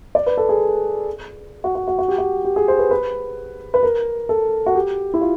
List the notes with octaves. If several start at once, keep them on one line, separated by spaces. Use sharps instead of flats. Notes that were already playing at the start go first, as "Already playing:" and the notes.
D5
B4
A4
G#4
F#4
F#4
F#4
F#4
G4
F#4
G4
G#4
C5
B4
B4
B4
A#4
A4
F#4
G4
E4
F4